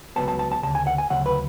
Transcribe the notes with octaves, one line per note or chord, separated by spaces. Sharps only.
C#2 C#3 F#3 B3 A5
A5
A5
A5
D2 C#3 A5
G#5
F#5
G#5
D2 C#3 F#3 F#5
B4